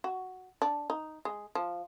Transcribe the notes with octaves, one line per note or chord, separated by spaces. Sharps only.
F#4
D4
D#4
G#3
F3